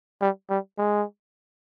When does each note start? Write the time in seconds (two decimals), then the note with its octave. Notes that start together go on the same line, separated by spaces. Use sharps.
0.21 G3
0.50 G3
0.78 G#3